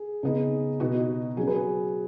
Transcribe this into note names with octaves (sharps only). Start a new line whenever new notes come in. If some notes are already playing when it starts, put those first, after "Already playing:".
Already playing: G#4
C#3 B3 D#4
B2 B3 D#4 F#4
F#4
F#3 C#4 G#4
B4
G#4